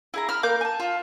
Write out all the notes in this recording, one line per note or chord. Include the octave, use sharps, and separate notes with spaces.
E4 G#4 A#5
B5 E6 F6
A#3 A#4 D6 G6
G#5 A5
F4 A5